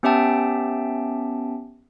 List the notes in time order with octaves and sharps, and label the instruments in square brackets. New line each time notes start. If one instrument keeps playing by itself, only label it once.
[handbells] B3 C#4 G4 E5 G5 A5